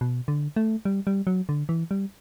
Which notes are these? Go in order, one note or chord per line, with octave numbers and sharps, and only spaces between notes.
B2
D3
A3
G3
G3
F#3
D3
E3
G3